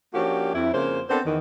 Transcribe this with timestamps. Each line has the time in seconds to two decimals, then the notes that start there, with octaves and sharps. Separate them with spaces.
0.14 F3 A#3 C#4 D4 F#4 G4
0.54 F2 E4
0.74 F2 C#3 A#3 C5
1.09 B3 C4 D4 A4 A#4 C5
1.25 E2 D#3